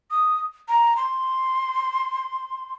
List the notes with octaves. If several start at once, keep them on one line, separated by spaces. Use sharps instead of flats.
D#6
A#5
C6